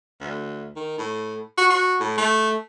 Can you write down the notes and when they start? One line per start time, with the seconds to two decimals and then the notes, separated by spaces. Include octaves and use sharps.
0.21 D2
0.76 D#3
0.98 A2
1.57 F#4
1.70 F#4
2.00 A2
2.18 A3